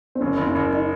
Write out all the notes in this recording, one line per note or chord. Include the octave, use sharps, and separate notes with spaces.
C4
F#1 C#4
F#1
C#4
F#1
D#4